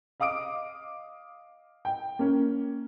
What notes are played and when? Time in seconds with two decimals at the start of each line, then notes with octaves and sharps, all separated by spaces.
0.20 D#5 F5 D6 D#6 D7
1.85 G5
2.19 A#3 C#4